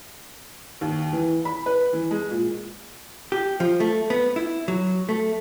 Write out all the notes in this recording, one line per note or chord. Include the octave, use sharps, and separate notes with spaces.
D#2
E3
B5
B4
E3
G#3
A#2
G4
F3
A3
B3
E4
F#3
A3